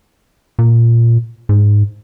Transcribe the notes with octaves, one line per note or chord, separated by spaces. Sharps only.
A#2
G#2